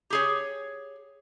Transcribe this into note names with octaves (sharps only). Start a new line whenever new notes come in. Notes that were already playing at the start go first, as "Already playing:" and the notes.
G4 G#4 C#5